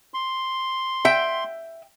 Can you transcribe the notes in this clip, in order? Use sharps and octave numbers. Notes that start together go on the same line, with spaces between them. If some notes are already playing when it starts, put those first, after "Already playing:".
C6
E5 G5